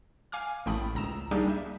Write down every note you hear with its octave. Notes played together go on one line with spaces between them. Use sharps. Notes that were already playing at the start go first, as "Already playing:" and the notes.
F5 G#5 D6 F6
A1 A2 A3 G5 B5 D#6
C#2 A#5 E6 E7
G3 A#3 D4 D#4 G#4
E5